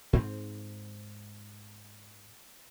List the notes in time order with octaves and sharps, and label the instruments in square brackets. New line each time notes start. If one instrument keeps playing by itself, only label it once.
[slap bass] G#2 C4